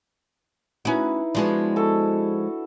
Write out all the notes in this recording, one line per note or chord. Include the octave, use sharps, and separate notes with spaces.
C#4 D#4 E4 F#4 B4
F3 G#3 B3 D4 F#4
F#4 A4